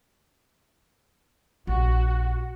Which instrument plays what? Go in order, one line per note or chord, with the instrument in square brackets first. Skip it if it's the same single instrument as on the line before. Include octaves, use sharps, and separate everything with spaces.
[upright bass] A#1 [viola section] F#4